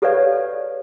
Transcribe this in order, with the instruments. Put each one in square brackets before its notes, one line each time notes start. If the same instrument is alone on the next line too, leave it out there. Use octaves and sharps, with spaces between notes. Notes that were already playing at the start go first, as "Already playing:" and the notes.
[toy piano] G4 A4 B4 C#5 D5 F5